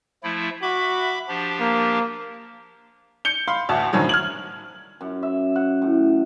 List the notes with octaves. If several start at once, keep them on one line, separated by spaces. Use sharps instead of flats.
F3 A3 E4
F#4 E5 B5 D6
F3 D4 G4
A#3
G6 C#7 G7
F5 B5 C6
A1 D2 F#4 A5
F#2 A2 D3 D#3 F3 F#3
F6 G#6 F#7
F#2
E5
F#5
A2